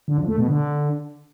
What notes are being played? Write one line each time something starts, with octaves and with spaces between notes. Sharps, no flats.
D3
F2
A3
B2
D3